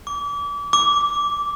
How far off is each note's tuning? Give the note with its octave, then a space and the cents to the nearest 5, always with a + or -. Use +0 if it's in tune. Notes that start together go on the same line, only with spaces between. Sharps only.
D6 -35
D6 -15